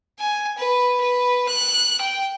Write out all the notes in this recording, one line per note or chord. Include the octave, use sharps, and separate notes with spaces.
G#5
B4
B4
F#6
G5